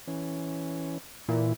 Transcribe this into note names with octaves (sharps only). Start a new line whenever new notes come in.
E3 C#4
A#2 E3 E4